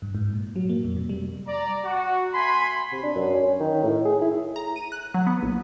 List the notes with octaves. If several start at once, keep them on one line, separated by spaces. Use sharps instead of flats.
G2
G#2
A#2
F#3
A#3
F2
C3
G3
D5 A#5
F#4
A3 G#5 B5 C6
C3
D4
F#2
C#4
D#3
A2
G#4
E4
A#5
D#7
F#6
F#3
B3
A#1